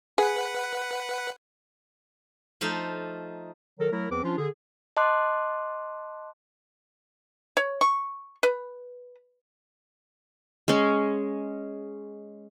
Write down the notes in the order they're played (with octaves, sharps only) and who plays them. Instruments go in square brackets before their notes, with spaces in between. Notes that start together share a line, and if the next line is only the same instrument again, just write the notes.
[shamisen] G#4 [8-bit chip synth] B4 F#5
[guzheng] F3 A3 D#4 F5
[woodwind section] D#3 F#3 A4 A#4
F#3 A3 E4 A#4
E2 F3 C4 B4 D6
F3 C#4 D4 F4
D3 G#4
[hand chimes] D#5 A5 C6 D6 F#6
[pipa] C#5
C#6
B4
[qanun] G#3 C#4